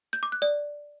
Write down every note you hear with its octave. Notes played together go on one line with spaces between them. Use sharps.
G6
D6
F#6
D5